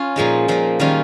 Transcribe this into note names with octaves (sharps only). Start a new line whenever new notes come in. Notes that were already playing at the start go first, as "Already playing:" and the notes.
Already playing: C#4 F4
A#2 F3 G#3 D#4
A#2 F3 A#3
D#3 G3 C#4 F4